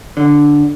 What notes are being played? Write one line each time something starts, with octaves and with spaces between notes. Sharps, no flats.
D3